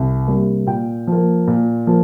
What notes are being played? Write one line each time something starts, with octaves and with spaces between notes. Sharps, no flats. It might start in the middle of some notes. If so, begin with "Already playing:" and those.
Already playing: C2
C3 G3 A#3
A#2 G5
F3 A#3
A#2
F3 A#3